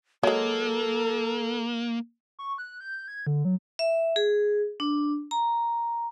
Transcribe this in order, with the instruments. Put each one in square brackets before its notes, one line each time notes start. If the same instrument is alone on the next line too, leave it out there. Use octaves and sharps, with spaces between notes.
[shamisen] F#3 G#3 [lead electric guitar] A#3 [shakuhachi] A4
[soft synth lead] C#6
F#6
G6
G#6
D3
F#3
[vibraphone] E5
G#4
D4
A#5